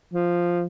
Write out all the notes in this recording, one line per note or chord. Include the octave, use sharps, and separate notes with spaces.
F3